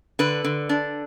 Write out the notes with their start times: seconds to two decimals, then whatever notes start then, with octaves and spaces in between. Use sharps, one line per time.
0.19 D3 B4
0.44 D3
0.69 D4